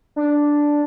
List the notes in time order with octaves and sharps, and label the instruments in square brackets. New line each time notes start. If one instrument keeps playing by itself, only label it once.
[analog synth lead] D4